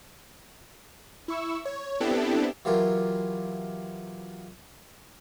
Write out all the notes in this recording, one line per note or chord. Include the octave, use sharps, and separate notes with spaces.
E4 C#6 E6
C#5
B3 C4 D4 E4 G4 A4
E3 F#3 F4 G4 A#4